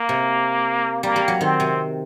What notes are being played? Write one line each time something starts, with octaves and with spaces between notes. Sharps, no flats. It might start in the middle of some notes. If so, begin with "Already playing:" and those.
Already playing: A#3
C3
G3 A#3
G3
F#3
D#3 C4
C3